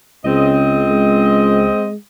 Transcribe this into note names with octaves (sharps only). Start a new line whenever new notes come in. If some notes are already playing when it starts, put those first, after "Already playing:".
C#2 C#3 C4 D#5
G#3